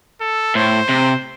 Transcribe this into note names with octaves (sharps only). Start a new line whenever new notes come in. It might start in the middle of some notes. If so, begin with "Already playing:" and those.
A4
A2 C5
C3